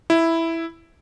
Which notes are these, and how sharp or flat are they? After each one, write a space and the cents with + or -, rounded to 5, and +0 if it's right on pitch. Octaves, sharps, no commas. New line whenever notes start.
E4 +0